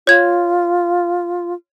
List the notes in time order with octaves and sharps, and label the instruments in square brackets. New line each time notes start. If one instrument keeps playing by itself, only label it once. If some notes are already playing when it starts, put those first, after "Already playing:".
[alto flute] F4 [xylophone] C#5 G#6